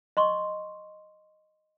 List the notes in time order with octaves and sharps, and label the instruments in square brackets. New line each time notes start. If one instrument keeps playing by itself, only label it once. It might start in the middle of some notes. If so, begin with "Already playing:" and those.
[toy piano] D#5 C6 C#6